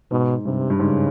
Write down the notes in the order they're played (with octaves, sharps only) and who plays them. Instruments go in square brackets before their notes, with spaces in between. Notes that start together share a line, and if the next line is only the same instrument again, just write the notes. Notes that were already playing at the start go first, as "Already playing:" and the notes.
[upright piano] G#2 [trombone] B2
[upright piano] G2 [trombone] C3
[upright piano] G2
[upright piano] G#2 [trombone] C#3